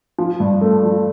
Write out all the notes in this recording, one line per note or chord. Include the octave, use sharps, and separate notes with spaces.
F3
G2
A3
F3